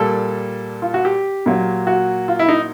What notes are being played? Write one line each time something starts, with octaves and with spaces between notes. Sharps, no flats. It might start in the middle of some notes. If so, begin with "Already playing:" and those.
Already playing: A#2 G3 A#3 A4
F4
F#4
G4
A#2 F#3 A#3
F#4
F4
E4
D#4